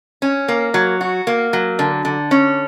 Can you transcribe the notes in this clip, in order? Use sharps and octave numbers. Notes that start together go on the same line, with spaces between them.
C#4
A#3
F#3
F#4
A#3
F#3
D3
D3
C#4